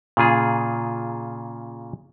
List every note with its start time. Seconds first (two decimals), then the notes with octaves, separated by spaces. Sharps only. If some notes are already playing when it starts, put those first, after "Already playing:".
0.17 A#2 C#3 F4 G#4